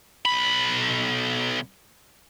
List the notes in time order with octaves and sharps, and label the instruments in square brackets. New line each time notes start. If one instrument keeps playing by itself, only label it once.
[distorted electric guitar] B1 B5